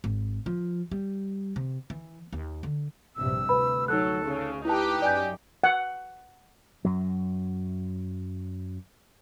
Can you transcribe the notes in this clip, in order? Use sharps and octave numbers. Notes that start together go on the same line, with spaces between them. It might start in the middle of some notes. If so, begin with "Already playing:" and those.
G#1
F3
G3
C3
E3
D#2
D3
A#1 G2 C3 E6
D2 B4 B5
F#3 D#4 A4 E6 F#6
C#3
D#4 E4 G4 B4 A5
F#2 D5 G#5 G6
F#5
F#2 F#3